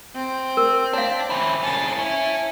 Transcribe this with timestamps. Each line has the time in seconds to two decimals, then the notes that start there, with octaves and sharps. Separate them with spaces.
0.16 C4
0.57 A#4
0.93 D4 C#5 F5
1.30 C#4 E4
1.64 A#3 C#4 A5
1.99 C#4 E4